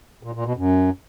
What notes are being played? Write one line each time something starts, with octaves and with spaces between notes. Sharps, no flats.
A#2
A#2
B2
F#2